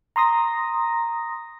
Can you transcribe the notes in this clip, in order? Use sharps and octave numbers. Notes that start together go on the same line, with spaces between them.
A#5 C6 D#6 A#6